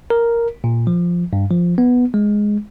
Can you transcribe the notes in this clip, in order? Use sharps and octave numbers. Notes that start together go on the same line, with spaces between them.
A#4
A#2
F3
G2
F3
B3
G#3